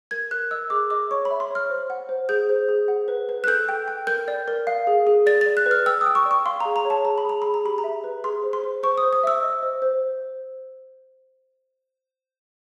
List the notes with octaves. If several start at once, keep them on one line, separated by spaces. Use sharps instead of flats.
A#4 G#6
A#4 F#6
D#5 E6
G#4 D6
D#5 D6
C#5 C#6
B5
E5
C6
C#5 F6
C5
F#5
C5
G#4 G6
C5
G#4
F#5
B4
B4
F#6
A4 G6
G5
G5
A#4 G6
D5
A#4
F5
G#4
G#4
D5 A6
D5 A6
F#6
B4
F6
G5 E6
D#6
G5
C#6
D5
C#6
F5 C6
G#4 A#5
A#5
C#5
A5
G#4 A#5
B5
G#4 A#5
G#4 B5
A#5
G4 B5
A#5
E5
B4
G#4 C6
C5
C6
C5
C5 C#6
D#6
C5
D#6
E5 E6
D#5
C5
C5